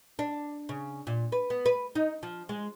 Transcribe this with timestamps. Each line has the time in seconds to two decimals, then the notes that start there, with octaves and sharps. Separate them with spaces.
0.19 D4
0.69 C#3
1.07 A#2
1.32 B4
1.50 B3
1.66 B4
1.95 D#4
2.23 F3
2.49 G#3